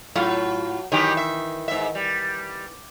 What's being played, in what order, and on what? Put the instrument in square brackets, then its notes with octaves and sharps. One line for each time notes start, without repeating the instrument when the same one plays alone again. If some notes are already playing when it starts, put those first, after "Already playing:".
[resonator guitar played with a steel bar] A2 F4 F5 [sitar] F#3
[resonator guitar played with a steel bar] D#3 E3 [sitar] F#3 G4
[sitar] E5
G#2 E5
G3